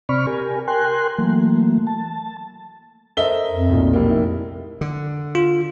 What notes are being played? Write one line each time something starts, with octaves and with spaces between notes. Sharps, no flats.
C3 C4 D5 B5 C#6 F6
G4 A#4 G#5
A#4 G5 G#5 C6 F#6
E3 F#3 A3 A#3
A5
A4 A#4 C5 D#5 E5 G7
F2
B1 A#2
F1 A#3
D#4 E4
D3
F4